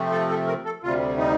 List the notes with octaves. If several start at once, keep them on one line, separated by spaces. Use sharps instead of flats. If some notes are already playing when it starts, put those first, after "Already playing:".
Already playing: C3 F3 A3 C4
A4
A4
A#4
A4
D2 C3 G3 F4
D#4